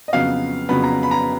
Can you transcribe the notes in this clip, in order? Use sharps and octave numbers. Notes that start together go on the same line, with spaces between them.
D#5
F2 C#3 F#3 B3 F5
F2 C#3 F#3 B3 B5
A#5
B5
A#5